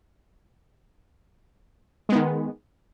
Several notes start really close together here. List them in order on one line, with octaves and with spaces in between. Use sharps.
G#3 B3 D#3